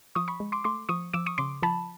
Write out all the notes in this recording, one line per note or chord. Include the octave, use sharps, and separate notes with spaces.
F3 C#6 D#6
B5 C#6
G#3
C6 D6
A3 C6 D6
F3 C#6 D#6
F3 D6 E6
C#6 D#6
C#3 C6 D6
F3 A5 B5